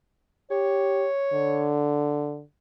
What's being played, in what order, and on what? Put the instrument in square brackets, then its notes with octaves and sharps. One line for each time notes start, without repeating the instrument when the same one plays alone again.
[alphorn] G4 [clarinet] C#5
[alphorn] D3